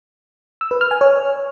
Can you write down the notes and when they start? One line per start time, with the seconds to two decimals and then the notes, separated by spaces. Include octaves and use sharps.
0.61 E6
0.71 B4
0.81 F6
0.91 G#5
1.01 C#5